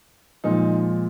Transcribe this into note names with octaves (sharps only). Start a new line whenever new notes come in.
A#2 F3 G#3 D#4